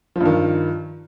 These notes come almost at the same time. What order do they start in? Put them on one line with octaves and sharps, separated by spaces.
F3 G2 D#3